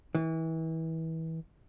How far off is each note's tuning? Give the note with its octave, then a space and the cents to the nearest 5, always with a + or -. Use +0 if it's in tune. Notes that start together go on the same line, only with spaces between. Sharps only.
E3 -30